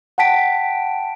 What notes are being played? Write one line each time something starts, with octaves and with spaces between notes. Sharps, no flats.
F#5 G5 A5 B6 D7